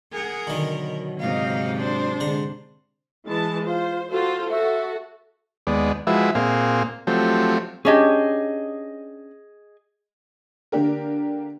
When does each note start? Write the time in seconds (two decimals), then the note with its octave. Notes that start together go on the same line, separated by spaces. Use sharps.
0.13 G#4 A#4 F#5
0.47 B2 D3 D#3 F#3
1.20 G#2 C3 D#4 F5
1.78 D4 C5
2.20 D3 G#3 A#5
3.27 E3 G#3 A5
3.65 F4 C5
4.10 F4 F#4 A4 C5
4.50 F#4 A4 E5
5.67 D#2 G#3 B3 D5
6.07 F3 G#3 E4 F#4 B4 E5
6.35 A#2 A#3 C4 G#4 F5
7.07 F3 F#3 A3 C4 G4
7.85 C#4 D4 G4 G#4 D#5
10.72 D3 A#3 D4 G4 A#4